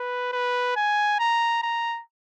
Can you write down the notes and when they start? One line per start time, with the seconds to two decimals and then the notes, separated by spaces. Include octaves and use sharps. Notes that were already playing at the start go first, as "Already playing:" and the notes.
Already playing: B4
0.32 B4
0.76 G#5
1.19 A#5
1.63 A#5